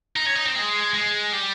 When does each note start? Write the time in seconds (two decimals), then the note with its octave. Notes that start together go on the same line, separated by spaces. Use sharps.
0.17 D#4
0.27 C#4
0.36 D#4
0.46 C4
0.56 G#3
0.94 G#3
1.33 G3